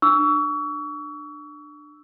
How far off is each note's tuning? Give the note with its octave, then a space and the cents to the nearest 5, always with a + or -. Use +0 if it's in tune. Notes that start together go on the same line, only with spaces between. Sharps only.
D4 +25 C#6 +35 E6 +0